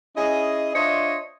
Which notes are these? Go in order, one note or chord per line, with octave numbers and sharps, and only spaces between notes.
C#4 E4 G#4 D#5
D4 F4 C5 C#5 D#5 E5